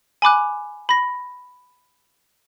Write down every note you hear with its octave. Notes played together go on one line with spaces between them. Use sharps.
G#5 B5 D6 F#6
B5 A#6